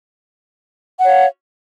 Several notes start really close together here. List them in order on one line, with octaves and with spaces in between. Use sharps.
F#5 C#5 F5